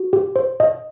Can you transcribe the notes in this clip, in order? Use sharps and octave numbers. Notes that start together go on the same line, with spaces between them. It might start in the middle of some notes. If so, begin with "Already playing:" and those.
Already playing: F#4
G4
C5
D#5